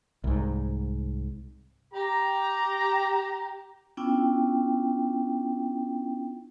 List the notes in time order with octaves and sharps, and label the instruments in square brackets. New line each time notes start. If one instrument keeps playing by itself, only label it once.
[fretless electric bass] C2 G#2
[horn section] G4 A#5
[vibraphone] B3 C#4 D4 E4 F4 G5